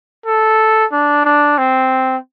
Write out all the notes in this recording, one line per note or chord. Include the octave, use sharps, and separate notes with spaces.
A4
D4
D4
C4